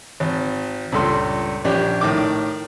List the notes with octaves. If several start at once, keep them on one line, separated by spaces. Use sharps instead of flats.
G#1
C#2 G2 A#2 A4 C6
A#1 C#4 D4 G4
A2 D#3 D6